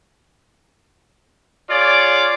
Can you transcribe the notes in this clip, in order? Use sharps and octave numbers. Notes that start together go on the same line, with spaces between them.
F4 G#4 C#5 D5